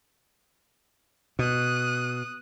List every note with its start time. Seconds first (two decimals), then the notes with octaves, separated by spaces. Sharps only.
1.39 B2 D#6 F#6